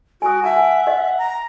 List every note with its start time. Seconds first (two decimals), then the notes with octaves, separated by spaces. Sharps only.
0.22 F#4 G#5 D#6
0.44 E5 F#5 A5
0.56 G#5
0.87 D#5
1.18 A#5